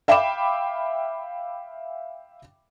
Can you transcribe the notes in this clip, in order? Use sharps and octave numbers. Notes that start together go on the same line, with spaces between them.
E5 F5 G5 B5 D6 E7